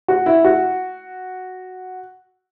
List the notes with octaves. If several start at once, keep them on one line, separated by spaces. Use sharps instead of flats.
F#4
E4
F#4